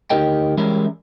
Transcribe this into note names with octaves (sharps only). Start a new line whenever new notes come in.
D2 D#4 G4 A#4 D#5 G5
E3 G3 G#3 C#4 E4 A#4